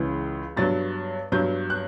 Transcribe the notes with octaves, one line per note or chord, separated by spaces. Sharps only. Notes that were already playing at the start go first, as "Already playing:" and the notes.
Already playing: C#2 C#3 E3
G2 F#3 B3 A6
G2 F#3 B3 G6
F#6